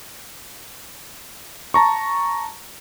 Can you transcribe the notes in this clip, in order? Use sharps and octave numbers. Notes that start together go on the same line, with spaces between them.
A5 A#5 C#6